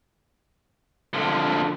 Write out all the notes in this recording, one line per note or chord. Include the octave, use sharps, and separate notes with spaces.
D3 F3